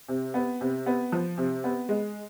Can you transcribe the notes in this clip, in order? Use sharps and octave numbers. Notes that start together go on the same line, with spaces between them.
C3
B3
C3
B3
F3
C3
B3
G#3